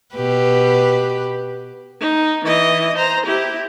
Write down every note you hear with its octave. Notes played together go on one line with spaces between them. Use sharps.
B2 G4 B4
D#4
E3 D#5
C5 A#5
E4 G4